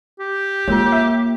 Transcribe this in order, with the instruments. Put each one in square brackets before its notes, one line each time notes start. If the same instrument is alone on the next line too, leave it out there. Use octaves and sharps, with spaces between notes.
[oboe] G4
[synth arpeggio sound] G#3 [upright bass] A#3 [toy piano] F4 A#4 C#5
[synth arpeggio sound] E5